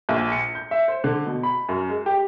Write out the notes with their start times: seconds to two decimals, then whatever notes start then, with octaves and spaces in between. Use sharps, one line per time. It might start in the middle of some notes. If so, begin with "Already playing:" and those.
0.09 A#1
0.32 C#7
0.55 G6
0.71 E5
0.88 C5
1.04 D3
1.26 B2
1.43 B5
1.69 F#2
1.90 G#3
2.06 G4